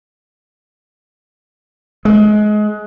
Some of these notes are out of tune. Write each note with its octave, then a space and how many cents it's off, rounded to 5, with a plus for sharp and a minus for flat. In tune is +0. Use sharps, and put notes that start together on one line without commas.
G#3 +25